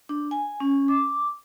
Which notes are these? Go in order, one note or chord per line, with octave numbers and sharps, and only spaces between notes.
D4
G#5
C#4
D6